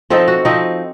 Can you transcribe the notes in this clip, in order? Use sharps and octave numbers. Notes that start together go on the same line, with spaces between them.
F3 C4 D#4 A4
F#4
F3 C4 D#4